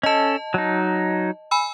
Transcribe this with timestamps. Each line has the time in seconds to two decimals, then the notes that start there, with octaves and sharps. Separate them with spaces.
0.03 C#4 A4 D#5 A5
0.54 F#3 D#4
1.51 G#5 B5 E6